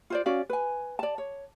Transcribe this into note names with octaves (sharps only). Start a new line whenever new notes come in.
F4 C5 D5
C#4 F#4 D5 F5
B4 G#5
D5 A5
C#5